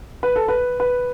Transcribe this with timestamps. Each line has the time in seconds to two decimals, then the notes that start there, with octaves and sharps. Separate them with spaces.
0.23 B4
0.36 A4
0.48 B4
0.80 B4